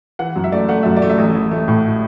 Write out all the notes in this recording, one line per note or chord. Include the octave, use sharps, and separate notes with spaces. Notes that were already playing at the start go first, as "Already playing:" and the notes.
E3 F#5
F#2
E5
A3 D5
A3 F#5
F#2 E5
D5
A3
E5
A1
A1
A3
A2